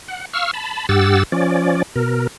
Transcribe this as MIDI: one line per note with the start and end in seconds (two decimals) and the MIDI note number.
0.08 0.25 78
0.33 0.51 77
0.33 0.51 85
0.33 0.51 88
0.33 0.51 89
0.54 0.87 81
0.54 0.87 83
0.89 1.23 43
0.89 1.23 67
0.89 1.23 78
0.89 1.23 88
0.89 1.23 93
1.32 1.83 53
1.32 1.83 61
1.32 1.83 74
1.96 2.27 47
1.96 2.27 70